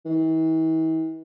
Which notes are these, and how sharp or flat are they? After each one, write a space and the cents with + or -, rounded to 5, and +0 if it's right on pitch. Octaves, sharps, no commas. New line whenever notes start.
E3 -45